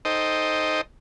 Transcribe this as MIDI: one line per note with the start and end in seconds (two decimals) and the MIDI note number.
0.05 0.81 63
0.05 0.81 69
0.05 0.81 72
0.05 0.81 75
0.05 0.81 79